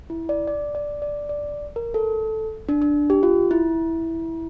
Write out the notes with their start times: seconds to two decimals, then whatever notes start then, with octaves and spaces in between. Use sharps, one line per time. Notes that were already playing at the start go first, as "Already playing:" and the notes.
0.10 E4
0.29 D5
0.48 D5
0.75 D5
1.02 D5
1.29 D5
1.76 A#4
1.94 A4
2.69 D4
2.82 D4
3.10 G4
3.23 F4
3.51 E4